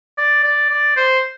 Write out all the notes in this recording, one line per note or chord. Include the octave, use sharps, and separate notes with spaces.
D5
D5
D5
C5